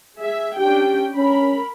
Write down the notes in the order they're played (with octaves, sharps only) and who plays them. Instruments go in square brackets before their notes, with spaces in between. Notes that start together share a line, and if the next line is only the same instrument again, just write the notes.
[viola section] G#4 E5
[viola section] C#4 D4 G5 [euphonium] G4
[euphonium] C#4 [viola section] A#4 B5